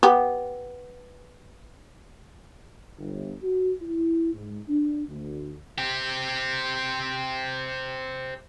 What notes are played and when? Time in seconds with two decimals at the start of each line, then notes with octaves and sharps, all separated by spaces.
0.03 B3 G4
2.98 G1
3.42 F#4
3.80 E4
4.33 G#2
4.68 D4
5.08 D2
5.78 C4 G4